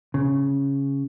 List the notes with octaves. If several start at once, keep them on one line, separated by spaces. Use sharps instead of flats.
C#3